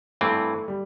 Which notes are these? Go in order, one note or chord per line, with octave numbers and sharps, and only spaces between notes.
G2 E3 A3 C4
G3